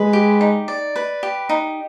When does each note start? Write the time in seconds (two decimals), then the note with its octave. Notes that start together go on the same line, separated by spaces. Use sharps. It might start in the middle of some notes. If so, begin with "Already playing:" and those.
Already playing: G#3 B4
0.13 G4
0.41 D#4
0.68 D5
0.96 B4
1.23 G4
1.49 D#4